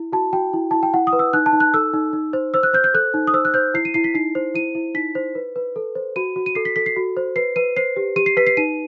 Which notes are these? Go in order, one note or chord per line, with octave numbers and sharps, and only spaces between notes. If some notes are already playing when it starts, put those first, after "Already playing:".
Already playing: E4
F#4 A5
F#4 G5
E4
E4 A5
G5
E4 F#5
D#6
B4
E6
D#4 F#6
A5
D#4
F#6
A4 E6
D#4
D#4
C5
C5 E6
F#6
C5 G6
G6
A4 F#6
D#4
D#6
C5 E6
F#6
C5 G6
E4 C7
D#7
E4 C7
B6
D#4 C7
C5
E4 D#7
E4
D#4 B6
C5
B4
B4
A4
C5
F#4 D#7
F#4
D#7
A4 C7
B6
A4 B6
C7
F#4
C5
B4 C7
B4 D#7
C5 C7
G4
G4 D#7
C7
B4 B6
C7
D#4 D#7